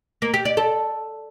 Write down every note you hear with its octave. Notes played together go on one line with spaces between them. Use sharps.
A#3
G4
D5
A4